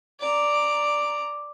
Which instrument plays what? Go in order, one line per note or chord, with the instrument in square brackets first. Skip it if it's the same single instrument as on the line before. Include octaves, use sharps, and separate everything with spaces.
[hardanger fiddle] D5 A#5